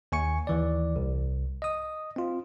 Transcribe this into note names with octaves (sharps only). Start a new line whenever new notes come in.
D#2 G#5 C#6 C#7
D#2 E3 D5
C2
D#5 D#6
C4 F4